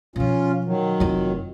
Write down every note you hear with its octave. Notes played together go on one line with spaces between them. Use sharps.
B2 F3 C#4 F4
D#3 F#3
F1 F4